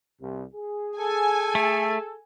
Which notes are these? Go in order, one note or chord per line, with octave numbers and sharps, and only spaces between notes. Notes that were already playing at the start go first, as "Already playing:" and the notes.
C2 C3
G#4
A4 G#5
A3